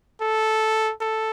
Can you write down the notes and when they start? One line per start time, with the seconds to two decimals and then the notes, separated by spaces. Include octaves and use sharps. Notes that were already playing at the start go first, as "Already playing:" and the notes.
0.21 A4
1.01 A4